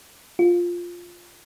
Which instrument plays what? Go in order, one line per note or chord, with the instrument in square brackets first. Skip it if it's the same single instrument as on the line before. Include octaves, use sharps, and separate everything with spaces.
[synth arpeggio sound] F4